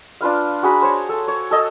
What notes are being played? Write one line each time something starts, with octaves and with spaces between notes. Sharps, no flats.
D4 F4 B4 F5
F#4 G#4 A#5 B5
C5 C#5
A4
C#5
A4 D#5 A5 E6